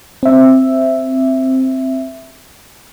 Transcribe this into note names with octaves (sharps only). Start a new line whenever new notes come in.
C4 E5